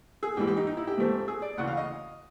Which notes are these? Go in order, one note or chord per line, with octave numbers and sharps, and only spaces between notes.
G#4
A1 G#2 E3 G4
G4
D#4
D#4
E4
G4
G#2 F3 A3 C4
G#4
D5
D2 C#3 E3 F#5
F5
D#5